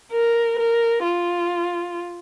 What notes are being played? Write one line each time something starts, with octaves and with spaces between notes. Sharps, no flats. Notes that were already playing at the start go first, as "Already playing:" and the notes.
A#4
A#4
F4